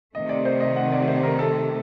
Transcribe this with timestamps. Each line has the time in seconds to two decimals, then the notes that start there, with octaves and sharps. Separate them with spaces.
0.14 C3 D#3 A3 D#5
0.29 D5
0.45 C5
0.60 D#5
0.76 F#5
0.92 D5
1.08 C5
1.23 A#4
1.39 A4